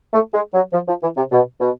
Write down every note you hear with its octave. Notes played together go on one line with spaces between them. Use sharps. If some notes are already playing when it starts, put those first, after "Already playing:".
A3
G#3
F#3
F3
F3
E3
C3
B2
B2